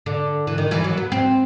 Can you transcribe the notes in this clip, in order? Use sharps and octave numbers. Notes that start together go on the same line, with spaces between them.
D3
E3
D#3
E3
F#3
B3
C4